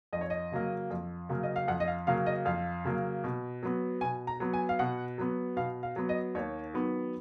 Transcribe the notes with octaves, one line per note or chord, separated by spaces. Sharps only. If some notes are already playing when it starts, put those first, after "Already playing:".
F2 D#5
C#5
D#5
C#3 F#3 A#3
F2
C#3 F#3 A#3
D#5
F5
F2 F#5
D#5
F5
C#3 F#3 A#3 F5
D#5
F2 F5
C#3 F#3 A#3
B2
F#3 B3
B2 G#5
A#5
F#3 B3
G#5
F5
B2 F#5
F#3 B3
B2 F5
F5
F#3 B3
D#5
D#2 C#5
D#3 F#3 B3